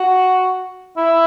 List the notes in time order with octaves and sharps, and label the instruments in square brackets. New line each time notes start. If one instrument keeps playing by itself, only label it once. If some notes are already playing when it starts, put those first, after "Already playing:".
Already playing: [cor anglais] F#4
E4